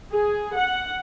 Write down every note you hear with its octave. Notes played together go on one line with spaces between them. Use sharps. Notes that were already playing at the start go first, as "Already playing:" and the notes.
G#4
F#5